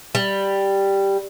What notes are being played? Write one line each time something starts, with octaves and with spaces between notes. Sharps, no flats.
G3